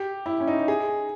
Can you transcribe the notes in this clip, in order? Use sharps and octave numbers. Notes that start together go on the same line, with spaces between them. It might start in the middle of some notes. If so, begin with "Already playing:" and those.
Already playing: G4
E4
C#4
D#4
G#4